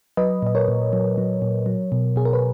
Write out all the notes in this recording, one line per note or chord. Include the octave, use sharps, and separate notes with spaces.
F#3 B4 D#5
A#2 D#5
A#4 C#5
A#2
F#3
F#3
A#2
F#3
B2
B2 G#4
A#4
B4